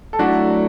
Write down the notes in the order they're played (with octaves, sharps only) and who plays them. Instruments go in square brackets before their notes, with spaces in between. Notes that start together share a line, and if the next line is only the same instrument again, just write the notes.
[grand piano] A4
[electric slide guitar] F#3 A3 E4 D5 [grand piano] D4 F#4